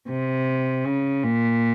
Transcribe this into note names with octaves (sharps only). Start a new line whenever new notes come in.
C3
C#3
A#2